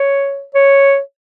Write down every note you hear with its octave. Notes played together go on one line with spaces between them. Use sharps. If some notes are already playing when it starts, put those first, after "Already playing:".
Already playing: C#5
C#5